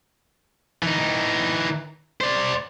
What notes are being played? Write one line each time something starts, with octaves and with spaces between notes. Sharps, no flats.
E3 D#4
C5 D5